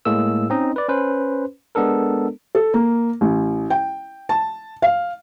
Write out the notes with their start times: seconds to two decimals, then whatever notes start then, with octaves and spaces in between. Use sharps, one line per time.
0.05 A2 G#3 A#3 G#4 E6
0.50 C4 C#4 D#4 D#5
0.76 B4 D5
0.89 C#4 B4 C5
1.75 G#3 B3 D4 A4 A#4
2.55 A4
2.74 A#3
3.21 A1
3.70 G5
4.29 A5
4.82 F5